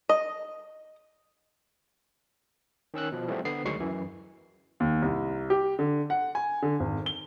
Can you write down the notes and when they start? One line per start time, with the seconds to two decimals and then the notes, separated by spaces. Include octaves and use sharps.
0.09 D#5
2.94 D#3 C#4 E6 F#6
3.12 B2 F3
3.28 E3 F3 G3 A3 B3 C4
3.45 D3 B3 C7
3.65 D2 D#3 F#3 G#3 C#6 C7
3.80 F#2 E3
4.80 D#2
5.02 C2
5.50 G4
5.79 D3
6.10 F#5
6.35 G#5
6.62 D3
6.80 G#1
7.06 G7